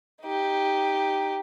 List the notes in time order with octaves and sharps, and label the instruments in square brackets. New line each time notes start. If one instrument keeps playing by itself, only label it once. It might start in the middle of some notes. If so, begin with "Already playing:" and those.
[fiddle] D#4 G4